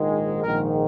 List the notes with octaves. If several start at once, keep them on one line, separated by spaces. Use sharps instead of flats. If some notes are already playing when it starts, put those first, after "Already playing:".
Already playing: A#1 G#2 D#3 G#3
A#1 G#2 D#3 A#4